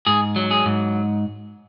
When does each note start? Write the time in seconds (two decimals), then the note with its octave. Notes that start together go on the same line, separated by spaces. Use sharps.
0.07 G#2 G#4
0.36 F#3
0.51 G#4
0.66 G#2